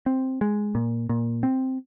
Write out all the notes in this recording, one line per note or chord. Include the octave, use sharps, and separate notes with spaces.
C4
G#3
A#2
A#2
C4